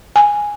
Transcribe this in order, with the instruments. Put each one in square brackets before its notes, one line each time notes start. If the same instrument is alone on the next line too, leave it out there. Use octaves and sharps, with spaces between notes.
[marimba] G#5